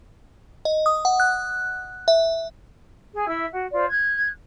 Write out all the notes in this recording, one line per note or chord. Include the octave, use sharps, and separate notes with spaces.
D#5
D#6
F#5
F#6
E5
G#4
E4 E5 E6
F#4
F4 C5 D5
F#6 G#6